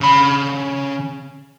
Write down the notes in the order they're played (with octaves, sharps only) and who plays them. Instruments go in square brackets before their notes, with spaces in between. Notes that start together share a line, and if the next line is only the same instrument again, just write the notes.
[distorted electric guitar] C#3 B5